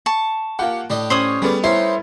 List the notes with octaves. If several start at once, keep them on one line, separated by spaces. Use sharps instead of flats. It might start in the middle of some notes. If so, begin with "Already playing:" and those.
A5 C#6
A#3 F4 G4 F#5
A2 D4 G4 D#5
C#4 C5 C#5 D#6 F#7
G3 A3 B3 G#4 D5
C#4 D#4 E4 C5 C6